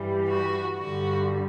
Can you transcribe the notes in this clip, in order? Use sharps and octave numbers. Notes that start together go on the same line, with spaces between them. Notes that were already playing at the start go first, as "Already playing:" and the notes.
Already playing: G2 E3 G3
F#4
G2 D3 G3 F#4